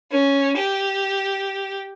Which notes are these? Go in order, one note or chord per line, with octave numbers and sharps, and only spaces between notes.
C#4
G4